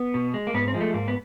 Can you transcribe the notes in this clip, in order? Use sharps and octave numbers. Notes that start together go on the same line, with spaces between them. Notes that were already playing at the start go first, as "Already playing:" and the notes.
Already playing: B3
B2
G#3
A#3
G#2 B3
C4
F3 G#3
A3
G#2 A#3
B3